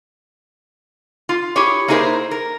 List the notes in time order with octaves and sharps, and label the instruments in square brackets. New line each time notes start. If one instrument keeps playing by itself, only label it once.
[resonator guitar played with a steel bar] F4
E4 G4 G#4 C#5
A#3 D#4 E4 G#4 A#4 C5
A#4